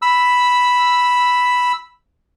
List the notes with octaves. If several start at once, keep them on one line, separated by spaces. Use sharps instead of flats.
B5 E6